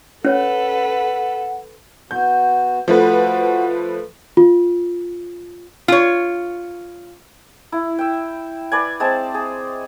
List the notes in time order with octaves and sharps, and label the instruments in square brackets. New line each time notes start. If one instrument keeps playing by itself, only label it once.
[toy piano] C#4 C#5 [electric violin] A4 B4 [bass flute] F#5
[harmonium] B3 F#4 [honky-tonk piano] G6
[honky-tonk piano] F3 A3 B4 [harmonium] F#4
[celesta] F4
[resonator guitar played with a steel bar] F4 C#5
[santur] E4
E5 G5
B4 D5 G#5
G#3 C4 C5 A5
G#4